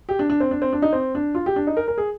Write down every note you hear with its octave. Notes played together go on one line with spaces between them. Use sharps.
G4
D4
D4
C4
D4
C4
D4
D#4
C4
D4
F4
G4
D4
D#4
A#4
A#4
G#4